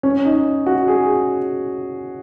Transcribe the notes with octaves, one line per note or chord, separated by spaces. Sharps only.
C#4
D#4
F#4
G#4